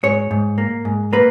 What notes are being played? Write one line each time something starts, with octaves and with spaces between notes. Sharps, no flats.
G#2 C#5
G#2
A#3
G#2
A#3 B4